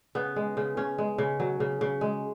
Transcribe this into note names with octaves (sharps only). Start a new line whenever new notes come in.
C#3 B3
G#3
C#3
C#3 C#4
G#3
C#3
F#3
C#3
C#3
G#3